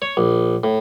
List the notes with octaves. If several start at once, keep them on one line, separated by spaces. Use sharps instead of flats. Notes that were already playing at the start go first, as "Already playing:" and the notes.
C#5
A#1
A2